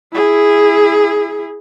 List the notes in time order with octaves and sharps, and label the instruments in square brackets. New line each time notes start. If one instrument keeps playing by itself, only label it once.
[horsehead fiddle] E4 G#4